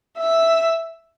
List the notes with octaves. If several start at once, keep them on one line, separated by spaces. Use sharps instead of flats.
E5